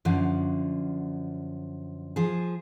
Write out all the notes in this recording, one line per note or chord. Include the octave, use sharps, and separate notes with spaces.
F#2 D3 F3
F3 G#4